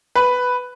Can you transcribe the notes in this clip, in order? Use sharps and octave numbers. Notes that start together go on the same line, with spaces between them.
B4